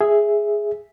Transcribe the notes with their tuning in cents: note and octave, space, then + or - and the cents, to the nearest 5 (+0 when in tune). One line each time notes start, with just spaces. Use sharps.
G#4 +0 E5 +0